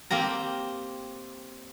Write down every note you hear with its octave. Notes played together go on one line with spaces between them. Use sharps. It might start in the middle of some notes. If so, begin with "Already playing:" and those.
A#3 C4 G4 A#5